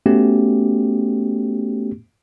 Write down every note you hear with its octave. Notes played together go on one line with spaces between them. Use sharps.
A3 B3 C#4 F#4 G4